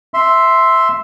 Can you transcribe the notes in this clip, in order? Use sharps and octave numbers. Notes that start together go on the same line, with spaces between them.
E5 C6